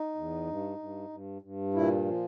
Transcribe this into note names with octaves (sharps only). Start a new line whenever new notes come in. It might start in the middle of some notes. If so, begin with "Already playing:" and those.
Already playing: D#4
E2
G2
G2
G2
G2
A#2 E4
F3